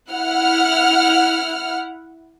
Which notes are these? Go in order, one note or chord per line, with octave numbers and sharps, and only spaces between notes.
E4 F#5 F6